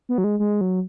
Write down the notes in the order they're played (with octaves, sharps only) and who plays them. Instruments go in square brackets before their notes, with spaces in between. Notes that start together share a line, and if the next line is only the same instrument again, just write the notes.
[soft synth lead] B3
F#3
G#3
G#3
F#3